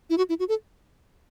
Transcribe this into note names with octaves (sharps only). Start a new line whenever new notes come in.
E4
F#4
E4
F#4
A4